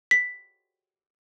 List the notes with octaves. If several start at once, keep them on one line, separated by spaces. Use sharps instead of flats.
B6